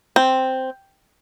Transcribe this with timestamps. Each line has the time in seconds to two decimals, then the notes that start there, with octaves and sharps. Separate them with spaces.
0.16 C4